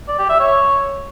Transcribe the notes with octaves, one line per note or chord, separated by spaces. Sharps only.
D5
G4
E5
C#5